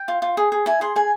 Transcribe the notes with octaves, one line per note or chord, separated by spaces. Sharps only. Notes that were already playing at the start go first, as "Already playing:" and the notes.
Already playing: G5
F4
F4
G#4
G#4
E4 G#5
G#4 C6
G#4 G#5